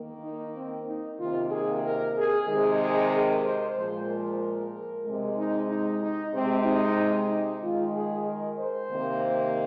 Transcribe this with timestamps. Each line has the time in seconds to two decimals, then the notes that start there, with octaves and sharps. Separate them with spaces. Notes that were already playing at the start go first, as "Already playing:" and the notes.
Already playing: D#3 A#3
0.22 D#4
0.55 C4
0.87 D#4
1.18 C3 D#3 A#3 F4
1.51 G#4
1.83 A#4
2.16 G#4
2.47 C3 D#3 G#3 G#4
2.80 G#4
3.12 A#4
3.44 C5
3.76 A#2 F3 G#3 C5
4.08 A#4
4.40 A#4
5.04 C3 G#3
5.37 D#4
5.68 D#4
6.01 D#4
6.33 C3 G#3 C4
6.65 D#4
7.29 D#4
7.62 D#3 G#3 F4
7.94 G#4
8.25 A#4
8.58 C5
8.90 C3 D#3 A#3